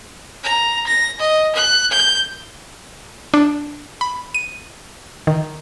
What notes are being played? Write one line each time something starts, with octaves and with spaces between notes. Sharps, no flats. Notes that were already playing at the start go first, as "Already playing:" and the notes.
A#5
A#6
D#5
F#6
G6
D4
B5
D#7
D#3